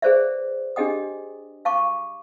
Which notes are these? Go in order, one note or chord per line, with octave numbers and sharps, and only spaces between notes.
G#4 B4 C5 D5 E5
D4 G4 G#4 D#5 G5 D#6
F5 A5 C#6 D6